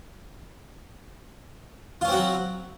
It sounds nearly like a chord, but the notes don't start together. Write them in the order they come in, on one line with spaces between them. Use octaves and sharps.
F4 C#4 C4 F#4 F#3